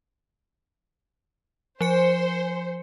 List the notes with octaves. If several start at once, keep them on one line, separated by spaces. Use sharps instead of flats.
F3 C5 G#5 C#7